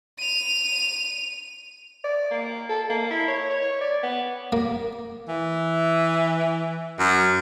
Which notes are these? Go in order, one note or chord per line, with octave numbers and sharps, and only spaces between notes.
D#7 F7
D5
A#3
A4
A#3
E4
C#5
C#5
D5
B3
A#3
E3
F#2